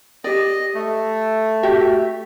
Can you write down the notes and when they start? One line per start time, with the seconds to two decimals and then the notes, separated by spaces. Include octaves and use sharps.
0.24 G4 D5 D#5
0.75 A3
1.63 F#4 G4 E5